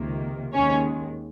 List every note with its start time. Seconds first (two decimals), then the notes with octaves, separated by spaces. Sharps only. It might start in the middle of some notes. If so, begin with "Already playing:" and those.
Already playing: C#2 C3 D#3 A#3
0.53 D#2 D#3 G#3 C#4 C#5